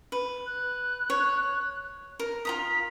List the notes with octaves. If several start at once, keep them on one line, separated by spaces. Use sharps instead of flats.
B4
F#6
C#5
A#4
F4 A#5 D#6 B6